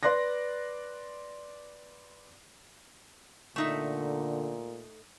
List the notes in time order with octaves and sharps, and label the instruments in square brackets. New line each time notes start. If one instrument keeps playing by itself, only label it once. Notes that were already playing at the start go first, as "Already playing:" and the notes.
[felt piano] B4 D5 C6 F#6 A#6
[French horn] A#2 [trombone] D3 [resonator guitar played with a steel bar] A3 D#4 E5